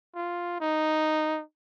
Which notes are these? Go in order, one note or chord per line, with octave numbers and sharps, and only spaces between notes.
F4
D#4